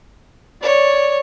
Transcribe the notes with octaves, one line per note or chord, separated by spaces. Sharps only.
C#5 D5